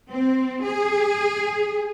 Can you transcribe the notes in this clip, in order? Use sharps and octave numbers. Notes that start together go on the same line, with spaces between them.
C4
G#4